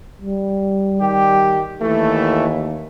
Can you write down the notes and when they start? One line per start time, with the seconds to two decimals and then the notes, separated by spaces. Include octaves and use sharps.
0.22 G3
1.01 D#3 G4
1.81 D#2 E3 A3